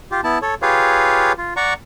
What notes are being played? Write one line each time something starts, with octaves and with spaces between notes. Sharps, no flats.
F4 G4
B3 E4 A5
A4 C#5
F4 G4 G#4 B4 C#5 F5
F4
D5 F#5 A#5 C#6